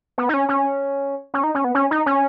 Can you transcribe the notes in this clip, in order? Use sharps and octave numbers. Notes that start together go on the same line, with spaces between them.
B3
D#4
C#4
C#4
C#4
D#4
C#4
B3
C#4
D#4
C#4